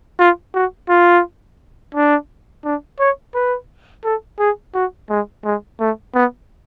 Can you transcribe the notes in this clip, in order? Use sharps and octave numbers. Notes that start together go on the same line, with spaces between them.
F4
F#4
F4
D4
D4
C#5
B4
A4
G#4
F#4
G#3
G#3
A3
B3